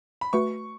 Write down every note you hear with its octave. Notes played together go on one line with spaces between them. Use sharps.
B5
A3 F#4 B4 C#6